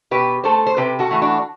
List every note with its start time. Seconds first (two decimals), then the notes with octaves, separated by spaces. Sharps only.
0.11 B2 G4 B4
0.44 A3 A4 C5
0.67 C5
0.77 C3 G4 B4
0.99 F#4 A4
1.11 E3 A3
1.22 D4 F#4